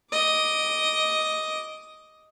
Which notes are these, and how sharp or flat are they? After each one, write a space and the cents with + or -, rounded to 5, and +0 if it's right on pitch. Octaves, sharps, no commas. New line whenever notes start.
D#5 +5 D6 +0